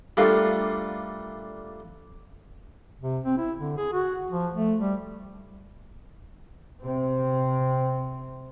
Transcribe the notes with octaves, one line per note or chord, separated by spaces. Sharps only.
G3 A3 A#3 D4 F4
C3
C4
E4
D3
G#4
F#4
F3
A3
G3
C3 C4